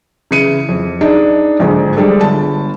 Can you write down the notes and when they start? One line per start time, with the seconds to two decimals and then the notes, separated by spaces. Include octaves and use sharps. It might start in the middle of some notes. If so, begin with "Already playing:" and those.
0.31 C#3 E3 C#7 D#7
0.69 F2
1.01 D4 D#4 G#4 D#5
1.59 A#1 G#2 D3
1.97 G3 G#3 D4 A4
2.21 G1 A5